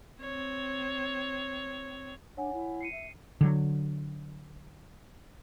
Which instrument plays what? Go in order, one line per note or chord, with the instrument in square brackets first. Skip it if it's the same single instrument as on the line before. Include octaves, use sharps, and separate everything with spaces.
[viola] C4 C#5
[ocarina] D4 [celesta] C#5 F#5 G#5
[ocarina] E4
[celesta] C7 C#7 D#7
[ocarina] E5
[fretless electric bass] D3 F#3